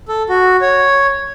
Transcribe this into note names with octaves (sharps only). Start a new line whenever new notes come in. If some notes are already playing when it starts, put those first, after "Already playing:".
A4
F#4
C#5